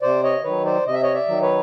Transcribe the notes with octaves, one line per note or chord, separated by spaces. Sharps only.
C3 C5 D5
C#5 D#5
D#3 F#3 B4 C#5
C5 D5
C3 D#5
E5
C#5 D#5
D5 E5
D#3 F#3
B4 C#5